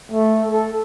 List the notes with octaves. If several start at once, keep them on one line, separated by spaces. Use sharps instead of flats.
A3
A4